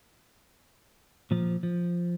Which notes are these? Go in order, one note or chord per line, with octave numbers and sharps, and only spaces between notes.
A#2 F3
F3